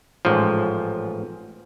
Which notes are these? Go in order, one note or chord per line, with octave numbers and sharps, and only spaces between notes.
A1 G#2 F3